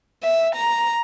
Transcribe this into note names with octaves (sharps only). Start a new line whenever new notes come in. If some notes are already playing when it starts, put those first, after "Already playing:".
E5
A#5